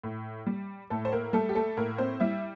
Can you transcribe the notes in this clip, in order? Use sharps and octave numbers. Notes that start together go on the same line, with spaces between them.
A2
G3
A2 A3 A4
C5
A#3 A#4
G3 A3 A4
G4
A3 A4
A2 A#3 A#4
C4 C5
G3 E4 E5